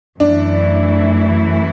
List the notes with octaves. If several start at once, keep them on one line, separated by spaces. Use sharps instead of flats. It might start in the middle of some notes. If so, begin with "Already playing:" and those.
F#2 E3 A3 D4 E4